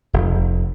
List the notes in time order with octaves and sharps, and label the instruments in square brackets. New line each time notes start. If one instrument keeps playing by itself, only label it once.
[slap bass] F1